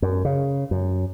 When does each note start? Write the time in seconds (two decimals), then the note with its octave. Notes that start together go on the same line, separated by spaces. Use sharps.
0.02 F#2
0.25 C#3
0.71 F#2